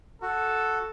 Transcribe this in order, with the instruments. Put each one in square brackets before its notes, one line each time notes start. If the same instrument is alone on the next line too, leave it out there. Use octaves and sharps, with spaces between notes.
[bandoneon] F#4 [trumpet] A4